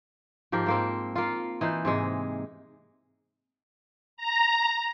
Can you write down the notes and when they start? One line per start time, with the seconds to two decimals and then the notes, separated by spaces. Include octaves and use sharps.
0.52 G#2 F3 G4 A#4
0.66 G#2 A#3 C4
1.16 A#3 F4
1.61 E3 D#4 C5
1.85 G#2 C3 G#3
4.17 A#5